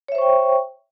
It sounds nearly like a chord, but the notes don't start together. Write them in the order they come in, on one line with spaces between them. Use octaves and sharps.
C#5 E5 C5 C#6 G5